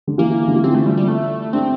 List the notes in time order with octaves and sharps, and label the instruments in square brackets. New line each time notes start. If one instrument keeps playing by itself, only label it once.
[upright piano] D3
[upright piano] E3 [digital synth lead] A#3
[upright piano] D3
E3
[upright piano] F3 [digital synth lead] C4
[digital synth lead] A3
G3
G3
A3
[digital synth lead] C4 [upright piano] D4